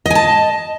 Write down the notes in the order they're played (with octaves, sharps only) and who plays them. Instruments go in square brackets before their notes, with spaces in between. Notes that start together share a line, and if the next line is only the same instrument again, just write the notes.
[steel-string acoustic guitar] D#5
G#5
A5